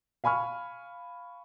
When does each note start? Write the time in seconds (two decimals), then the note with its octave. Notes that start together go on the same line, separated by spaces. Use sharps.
0.24 F5 G#5 B5 C#6 F6